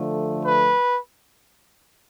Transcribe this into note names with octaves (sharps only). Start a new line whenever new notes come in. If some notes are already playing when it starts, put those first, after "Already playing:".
Already playing: D3 F3 A3
B4